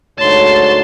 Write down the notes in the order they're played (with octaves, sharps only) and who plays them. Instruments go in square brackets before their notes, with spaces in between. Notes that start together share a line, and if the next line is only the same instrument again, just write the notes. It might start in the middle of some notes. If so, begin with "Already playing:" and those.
[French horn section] D2 G#2 C#5 [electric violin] A5 C6